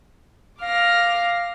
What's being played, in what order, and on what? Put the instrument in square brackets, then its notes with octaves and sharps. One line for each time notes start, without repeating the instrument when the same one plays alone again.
[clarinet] F5 [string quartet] D6 F6 A#6